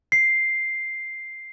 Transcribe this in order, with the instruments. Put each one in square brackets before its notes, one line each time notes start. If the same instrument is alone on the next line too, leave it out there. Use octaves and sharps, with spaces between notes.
[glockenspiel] C7